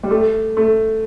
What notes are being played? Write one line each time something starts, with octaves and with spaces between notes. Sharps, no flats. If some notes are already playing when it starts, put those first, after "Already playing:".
G3
A3
A3